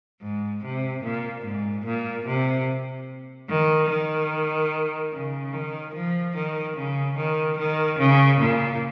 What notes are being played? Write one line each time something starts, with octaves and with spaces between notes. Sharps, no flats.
G#2
C3
A#2
G#2
A#2
C3
D#3
D#3
C#3
D#3
F3
D#3
C#3
D#3
D#3
C#3
A#2